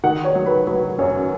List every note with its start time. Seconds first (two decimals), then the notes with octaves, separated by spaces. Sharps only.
0.04 D#3 F#5
0.24 C#5
0.35 F#3
0.46 B4
0.67 F#3 B4
0.99 F#2 C#5